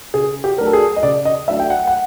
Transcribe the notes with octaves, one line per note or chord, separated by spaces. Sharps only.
C#3 G#4
G4
F#3 A3 D4 A#4
A4
G#4
D#5
C#3 D5
D#5
F#3 A3 D4 E5
G5
F#5
F#5